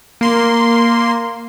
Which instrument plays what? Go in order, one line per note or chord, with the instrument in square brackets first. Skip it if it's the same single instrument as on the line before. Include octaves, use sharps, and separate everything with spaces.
[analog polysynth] A#3 C6